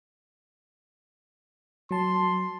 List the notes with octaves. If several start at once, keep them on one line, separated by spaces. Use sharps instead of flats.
F#3 A5 C6